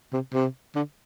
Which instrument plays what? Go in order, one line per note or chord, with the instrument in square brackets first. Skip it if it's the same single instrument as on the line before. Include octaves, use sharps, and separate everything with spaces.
[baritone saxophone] C3
C3
D3